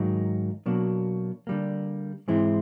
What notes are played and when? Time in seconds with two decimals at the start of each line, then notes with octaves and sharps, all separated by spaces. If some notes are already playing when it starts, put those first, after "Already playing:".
Already playing: G#2 D#3 F#3 A#3 D#4
0.66 B2 F#3 A#3 D4
1.47 D3 G3 A#3
2.28 G#2 E3 G#3 C4 E4